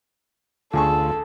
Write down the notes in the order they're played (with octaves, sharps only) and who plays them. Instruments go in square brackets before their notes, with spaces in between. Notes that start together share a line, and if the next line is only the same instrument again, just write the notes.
[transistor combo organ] D2 F4 [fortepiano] D3 G#4 C#6 [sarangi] A4